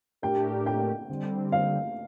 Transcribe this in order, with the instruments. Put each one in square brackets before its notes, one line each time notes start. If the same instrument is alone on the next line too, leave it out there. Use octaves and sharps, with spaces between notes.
[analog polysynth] A2 A3 D4 G4 A#4 [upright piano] G5
[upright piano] G5
[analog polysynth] D3 G3 C4
[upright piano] F5